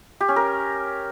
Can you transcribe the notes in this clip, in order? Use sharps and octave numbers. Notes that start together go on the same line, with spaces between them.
G4
C#4
A#4